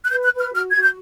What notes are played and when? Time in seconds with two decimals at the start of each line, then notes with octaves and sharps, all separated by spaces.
0.03 F#6
0.10 B4 G6
0.24 F#6
0.32 B4
0.38 F6
0.52 F#4 F6
0.70 F#4 G#6
0.81 G6